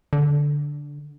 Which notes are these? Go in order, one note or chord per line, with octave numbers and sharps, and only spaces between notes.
D3